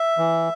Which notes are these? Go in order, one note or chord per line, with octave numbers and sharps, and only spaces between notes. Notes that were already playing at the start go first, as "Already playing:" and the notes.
Already playing: E5
E3